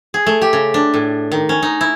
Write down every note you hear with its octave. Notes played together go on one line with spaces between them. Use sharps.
G#4
A3
G4
C#3
D4
A2
D#3
C#4
D#4
E4